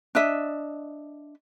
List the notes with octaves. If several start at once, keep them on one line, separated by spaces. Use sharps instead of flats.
D4 D#5 E5